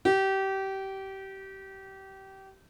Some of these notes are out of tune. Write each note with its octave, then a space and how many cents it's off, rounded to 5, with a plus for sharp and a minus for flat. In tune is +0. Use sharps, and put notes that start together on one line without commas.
G4 -25